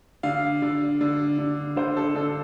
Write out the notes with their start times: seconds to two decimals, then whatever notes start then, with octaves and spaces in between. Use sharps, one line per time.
0.23 D3 F5
0.62 D3
1.01 D3
1.38 D3
1.76 D3 C5
1.97 A4
2.15 D3 A4